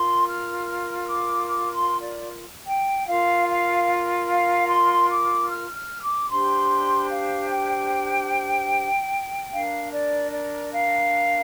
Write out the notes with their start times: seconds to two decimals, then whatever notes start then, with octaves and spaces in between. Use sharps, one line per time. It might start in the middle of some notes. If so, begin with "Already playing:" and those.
Already playing: F4 A#4 C6
0.25 F6
0.65 F6
1.06 D6
1.46 D6
1.74 C6
2.00 D5
2.67 G5
3.07 F4 A#4 F5
3.47 F5
4.28 F5
4.68 C6
5.09 D6
5.48 F6
5.75 F6
6.02 D6
6.29 D4 G4 C5 C6
7.09 F5
7.50 G5
9.51 D4 A#4 F5
9.91 D5
10.32 D5
10.72 F5